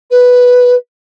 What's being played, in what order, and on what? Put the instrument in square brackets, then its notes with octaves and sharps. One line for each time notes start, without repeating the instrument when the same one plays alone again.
[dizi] B4